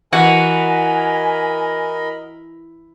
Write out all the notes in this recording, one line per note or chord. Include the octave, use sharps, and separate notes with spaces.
E3 F#4 A#4 D#5 F#5 G#5 B5